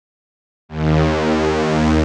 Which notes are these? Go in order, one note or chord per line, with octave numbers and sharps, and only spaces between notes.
D#2